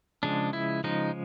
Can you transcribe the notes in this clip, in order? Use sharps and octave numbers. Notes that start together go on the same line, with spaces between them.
C#3 F3 G#3 D4
E4
C#3 F3 G#3 D#4